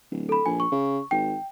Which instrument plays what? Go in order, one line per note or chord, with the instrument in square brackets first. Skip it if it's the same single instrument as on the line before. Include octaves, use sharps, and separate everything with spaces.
[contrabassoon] D1
[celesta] A4 B5
[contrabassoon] A#1 [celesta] G#5
[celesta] C#6
[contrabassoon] C#3
[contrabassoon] G#1 [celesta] G5